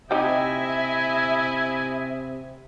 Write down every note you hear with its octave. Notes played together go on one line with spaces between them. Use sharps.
C3 C4 D#4 E4 G4 D#5 E5 G#5